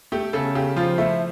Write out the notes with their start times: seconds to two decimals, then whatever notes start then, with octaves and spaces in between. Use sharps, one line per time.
0.12 A3 G4
0.33 C#3 A4
0.55 C#3 G4
0.76 F3 F4
0.98 A3 E4